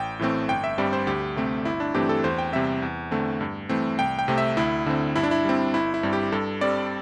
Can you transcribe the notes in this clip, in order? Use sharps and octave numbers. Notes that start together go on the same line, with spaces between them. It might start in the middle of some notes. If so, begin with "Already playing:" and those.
Already playing: A1 G5
A2 E3 A3 C4
G1 G5
E5
G2 G3 C4 D5
C5
D2 G4
C3 A3 C4
G1 E4
D4
G2 E3 A3 C4 G4
A4
E2 C5
G5
C3 G3 C4 E5
E2
D3 A3 C4
G2
E3 A3 C4
C2 G5
G5
C3 A3 C4
E5
D2 E4
D3 C4
G2 E4
D4
E4
G3 C4
G1 E4
E4
G2 G3 C4
G4
G2 A4
G3 C4 D5